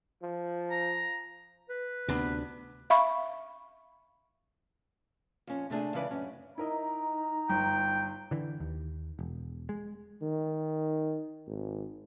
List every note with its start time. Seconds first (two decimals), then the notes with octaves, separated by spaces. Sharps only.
0.23 F3
0.71 A#5
1.69 B4
2.08 D2 C3 B3 D4 B5
2.90 E5 F5 B5 C#6
5.47 F2 C#4
5.70 C3 A3 D4 G#4
5.94 C#3 E3 G#3 B4 D5
6.11 F#2 C#4
6.58 D#4 E4 A#4 D#5 A#5
7.49 G1 G5
8.31 D3 E3
8.60 D#2
9.19 E1
9.69 G#3
10.23 D#3
11.47 G#1